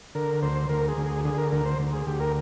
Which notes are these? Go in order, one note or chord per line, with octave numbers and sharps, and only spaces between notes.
D3 A#4
D2 C5
D2 A#4
G#4
D2
G#4
D3 G#4
A#4
D2 A#4
C5
D2
G#4
D2 G4
A#4